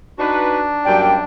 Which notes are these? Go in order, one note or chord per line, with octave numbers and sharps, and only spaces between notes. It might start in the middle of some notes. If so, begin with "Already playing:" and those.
D4 D#4 F#4 B4
F#2 G3 A#3 D5 G5